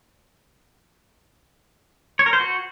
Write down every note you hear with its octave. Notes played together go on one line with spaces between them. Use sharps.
C#5
A#4
C5
F#4